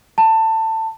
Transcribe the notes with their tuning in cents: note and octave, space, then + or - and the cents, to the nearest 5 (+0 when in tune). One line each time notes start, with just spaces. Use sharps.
A5 +20